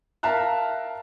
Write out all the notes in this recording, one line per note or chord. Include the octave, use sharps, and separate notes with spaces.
A#4 E5 F5 A5 A#5 F#6